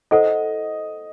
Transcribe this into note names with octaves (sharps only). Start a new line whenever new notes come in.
E4 A4 C5 D#5 F#5